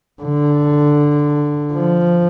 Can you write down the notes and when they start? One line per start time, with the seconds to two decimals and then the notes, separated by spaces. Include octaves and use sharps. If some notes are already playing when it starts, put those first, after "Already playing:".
0.23 D3
1.74 F3